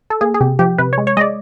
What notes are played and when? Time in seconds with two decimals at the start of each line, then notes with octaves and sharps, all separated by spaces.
0.10 A4
0.21 A#3 G#4
0.34 G#4
0.40 C3 G4
0.59 F3 G4
0.78 C3 B4
0.93 G#3 C#5
1.07 C#5
1.17 G#3 D#5
1.21 D5